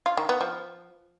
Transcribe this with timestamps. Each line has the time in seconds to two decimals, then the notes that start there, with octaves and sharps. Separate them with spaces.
0.06 F4
0.17 D#3
0.29 B3
0.41 F3